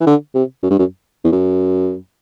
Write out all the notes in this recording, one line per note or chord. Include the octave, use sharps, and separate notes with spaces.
E3
D3
C3
F#2
G2
F#2
E2
F#2